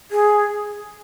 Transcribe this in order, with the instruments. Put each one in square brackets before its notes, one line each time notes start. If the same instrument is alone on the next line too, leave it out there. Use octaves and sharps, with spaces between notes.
[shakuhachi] G#4